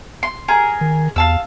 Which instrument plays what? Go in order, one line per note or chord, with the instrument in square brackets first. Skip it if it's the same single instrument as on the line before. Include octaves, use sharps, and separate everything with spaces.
[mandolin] C6
G#4 A#4
[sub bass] D#3
[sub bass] E2 [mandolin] F5 A5 E6